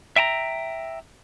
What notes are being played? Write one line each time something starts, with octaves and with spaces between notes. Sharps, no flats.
E5 G5 A5 A#5